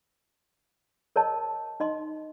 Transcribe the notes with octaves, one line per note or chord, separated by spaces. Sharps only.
A#4 C#5 D#5 A5
D#4 D#5 C6